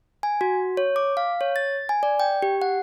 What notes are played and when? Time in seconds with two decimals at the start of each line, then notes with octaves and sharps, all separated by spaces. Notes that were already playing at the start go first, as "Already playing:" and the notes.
0.23 G#5
0.41 F#4
0.77 C#5
0.96 D6
1.17 F5
1.41 C#5
1.56 A6
1.89 G#5
2.03 D5
2.20 G5
2.42 G4
2.62 F#5